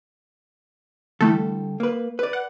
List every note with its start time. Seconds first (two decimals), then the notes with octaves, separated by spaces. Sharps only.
1.21 D3 E3 G3 A3 A4
1.80 A#3 B4
2.19 B4 D5
2.33 F#5